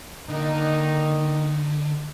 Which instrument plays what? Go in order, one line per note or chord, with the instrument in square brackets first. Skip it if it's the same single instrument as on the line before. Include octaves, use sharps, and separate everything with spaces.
[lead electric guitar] D3 [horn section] D#3 A#3 D#4